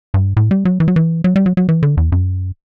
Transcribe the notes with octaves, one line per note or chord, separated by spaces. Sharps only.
G2
A2
G3
F#3
E3
F#3
E3
F#3
G3
F#3
F#3
E3
D3
E2
F#2